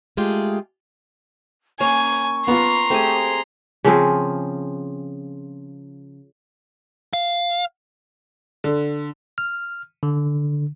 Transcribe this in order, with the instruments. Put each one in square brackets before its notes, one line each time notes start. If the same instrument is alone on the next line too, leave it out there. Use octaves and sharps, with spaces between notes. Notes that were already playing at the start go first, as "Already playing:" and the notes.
[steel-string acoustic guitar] G#3 A3 F4 G4 G#4
[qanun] A#3 C#4 [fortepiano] C#5 [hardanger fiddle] G#5 [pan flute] C#6
[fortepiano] B3 F4 [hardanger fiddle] A#5 C6
[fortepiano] A3 [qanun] C4 G4 G#4
[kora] C#3 F3 C4 G#4
[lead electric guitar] F5
[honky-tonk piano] D3
[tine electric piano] F6
D3